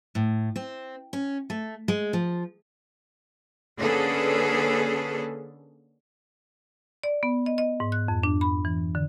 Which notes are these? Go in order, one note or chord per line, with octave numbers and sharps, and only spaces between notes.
A2
C4
C#4
A3
G#3
F3
D3 A#3 C#4 G#4 A4 B4
D5
B3
D#5
D#5
G#2
F#6
F2
D4
B5
E3
D3